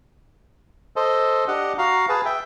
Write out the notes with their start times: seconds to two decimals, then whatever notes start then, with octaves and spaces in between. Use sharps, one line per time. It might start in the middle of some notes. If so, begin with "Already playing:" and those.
0.96 A4 C5 D#5
1.48 D4 G4 D#5 F#5
1.78 F#4 F5 A#5
2.09 G#4 B4 A5
2.25 E5 G5